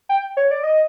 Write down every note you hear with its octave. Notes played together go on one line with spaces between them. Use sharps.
G5
C#5
D5
D#5